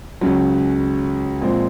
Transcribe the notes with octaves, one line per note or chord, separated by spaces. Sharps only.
C#2 C#3 F#3
A#2 F3 G#3 C4